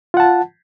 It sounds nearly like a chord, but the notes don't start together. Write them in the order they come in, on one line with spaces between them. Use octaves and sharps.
F4 F#5 A5